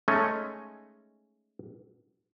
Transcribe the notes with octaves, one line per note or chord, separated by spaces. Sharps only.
G#3 A3 C#4 D#4